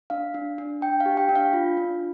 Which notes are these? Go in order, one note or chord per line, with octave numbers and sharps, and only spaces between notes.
D4 F5
D4
D4
D4 G5
F5
G4
G5
D4
F5
F4
D4